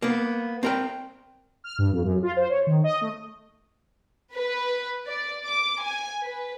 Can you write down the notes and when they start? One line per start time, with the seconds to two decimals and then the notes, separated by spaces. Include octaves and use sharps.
0.02 A#3 B3
0.63 C4 A#4 G5
1.64 F6
1.78 G2
1.92 F2
2.04 F#2
2.23 F4
2.36 C5
2.50 C#5
2.67 D#3
2.84 D#5
3.01 A3
4.35 B4
5.07 D5
5.46 D6
5.83 G#5
6.24 B4